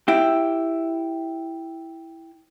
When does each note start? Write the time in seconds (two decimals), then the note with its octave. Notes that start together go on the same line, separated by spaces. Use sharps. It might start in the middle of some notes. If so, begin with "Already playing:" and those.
0.08 E4 G4